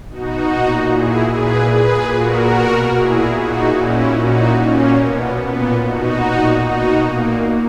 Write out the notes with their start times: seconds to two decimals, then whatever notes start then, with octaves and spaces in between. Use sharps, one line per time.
0.10 B2 D#4 F#4
0.51 A#2
0.92 A#2 E4 G#4
1.33 A#2 G#4 B4
1.74 A#2 G#4 B4
2.15 A#2 F#4 A#4
2.56 B2
2.97 A#2 E4 G#4
3.38 A#2 D#4 F#4
3.79 A#2 C#4 E4
4.19 A#2 D#4 F#4
4.60 A#2 A#3 C#4
5.01 B2 B3
5.42 A#2 B3
5.83 B2 D#4 F#4
6.24 A#2
6.65 B2 D#4 F#4
7.06 A#2 A#3